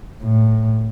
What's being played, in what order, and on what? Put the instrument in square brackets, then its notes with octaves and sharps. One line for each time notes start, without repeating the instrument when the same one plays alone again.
[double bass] A2